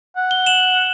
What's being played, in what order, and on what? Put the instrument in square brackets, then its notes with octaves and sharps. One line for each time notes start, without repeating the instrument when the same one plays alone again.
[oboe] F#5
[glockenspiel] G7
E7 F#7